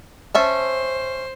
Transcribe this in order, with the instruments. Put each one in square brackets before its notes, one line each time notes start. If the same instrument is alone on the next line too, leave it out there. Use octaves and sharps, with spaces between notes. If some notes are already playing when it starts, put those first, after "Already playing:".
[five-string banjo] C#4 E5 A5 [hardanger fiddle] C5